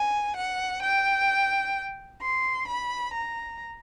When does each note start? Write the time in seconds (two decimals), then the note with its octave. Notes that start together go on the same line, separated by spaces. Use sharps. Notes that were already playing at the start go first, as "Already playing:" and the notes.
Already playing: G#5
0.36 F#5
0.82 G5
2.20 C6
2.67 B5
3.13 A#5